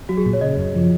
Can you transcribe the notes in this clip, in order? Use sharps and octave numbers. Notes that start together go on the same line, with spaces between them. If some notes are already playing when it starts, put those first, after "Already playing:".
F#3 F#4
G#4
A#2
C#5
C#3 D#5
F#2
F3